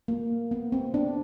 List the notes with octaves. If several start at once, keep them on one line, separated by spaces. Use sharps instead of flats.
A#3
B3
C4
D4